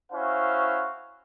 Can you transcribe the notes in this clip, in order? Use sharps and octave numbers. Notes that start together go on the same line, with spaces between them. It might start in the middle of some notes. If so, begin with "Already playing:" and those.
C#4 E4 F#4 C5 F5